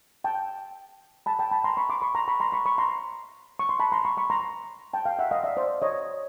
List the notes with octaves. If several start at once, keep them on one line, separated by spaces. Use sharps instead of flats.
G5 A5
A5 B5
G5 A5
A5 B5
A#5 C6
B5 C#6
C6 D6
B5 C#6
A#5 C6
B5 C#6
A#5 C6
B5 C#6
B5 C#6
A#5 C6
C#6
C6
A5 B5
A#5 C6
B5 C#6
B5 C#6
A#5 C6
G5 A5
F5 G5
E5 F#5
D#5 F5
D5 E5
C5 D5
C#5 D#5